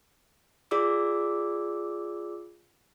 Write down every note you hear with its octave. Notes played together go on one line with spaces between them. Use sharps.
F4 G#4 D5 D6 E6